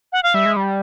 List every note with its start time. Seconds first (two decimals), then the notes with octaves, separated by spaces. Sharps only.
0.12 F#5
0.23 F5
0.34 G3 E5
0.45 G#3
0.56 G3